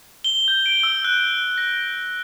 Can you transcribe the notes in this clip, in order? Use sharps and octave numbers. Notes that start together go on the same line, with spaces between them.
G7
G6
D7
E6
F#6
A#6